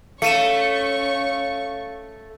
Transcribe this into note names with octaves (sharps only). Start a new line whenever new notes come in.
A3 C#4 F5 C#6 C#7 D#7 E7